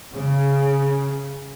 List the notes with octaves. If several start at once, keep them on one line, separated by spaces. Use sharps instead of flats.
C#3